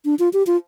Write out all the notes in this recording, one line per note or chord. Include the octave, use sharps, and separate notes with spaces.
D4
F4
G4
F4